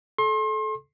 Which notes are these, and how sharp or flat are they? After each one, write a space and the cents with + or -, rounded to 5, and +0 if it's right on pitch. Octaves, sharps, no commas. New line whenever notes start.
A4 -25 C6 +35